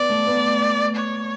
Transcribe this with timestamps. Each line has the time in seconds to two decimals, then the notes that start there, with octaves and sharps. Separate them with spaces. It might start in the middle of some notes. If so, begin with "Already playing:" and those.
Already playing: B3 D5
0.09 A3
0.26 B3
0.96 C#5